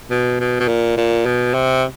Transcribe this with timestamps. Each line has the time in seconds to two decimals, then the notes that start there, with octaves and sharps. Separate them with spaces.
0.11 B2
0.40 B2
0.60 B2
0.68 A#2
0.97 A#2
1.26 B2
1.54 C3